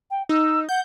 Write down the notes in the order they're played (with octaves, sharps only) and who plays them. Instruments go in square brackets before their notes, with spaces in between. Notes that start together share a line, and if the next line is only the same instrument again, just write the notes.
[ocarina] G5
[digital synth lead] D#4 [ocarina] E6
[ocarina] F#5 [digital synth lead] G6